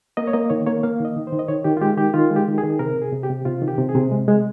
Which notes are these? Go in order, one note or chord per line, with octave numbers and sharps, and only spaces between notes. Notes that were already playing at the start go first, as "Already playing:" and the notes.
A#3 D#5
C#5
A#3 D#5
D#3 C#5
A#3 C#5
A#3 F5
D#3 D#5
D#3
C5
D#3
D#5
D#3 C#5
D#3 G4
F4
G#3 G4
D#3 G4
D#3 F4
G#3
G4
D#3
G#4
D#3
C3 A#4
C3
G#4
C3
G4
C3
C3 F4
D#3
G4
C3
G#4
C3
G#3
G#3